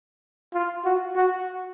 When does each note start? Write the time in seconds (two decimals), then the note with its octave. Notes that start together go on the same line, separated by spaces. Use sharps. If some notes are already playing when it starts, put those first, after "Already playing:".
0.53 F4
0.85 F#4
1.16 F#4